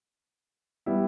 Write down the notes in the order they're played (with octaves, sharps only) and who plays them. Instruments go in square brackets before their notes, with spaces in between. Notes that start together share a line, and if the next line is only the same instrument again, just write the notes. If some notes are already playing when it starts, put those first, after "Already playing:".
[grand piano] G3 B3 E4